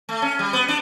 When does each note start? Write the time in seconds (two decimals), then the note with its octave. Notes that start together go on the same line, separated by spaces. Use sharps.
0.09 A3
0.22 C#4
0.39 G3
0.53 B3
0.68 D4